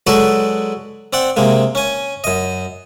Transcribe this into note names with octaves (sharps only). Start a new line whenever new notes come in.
F#3 G#3 F#4 A4 B4 D5
C4 D5 F#5
C3 G#3 A#3
C#4 G#5
F#2 D#5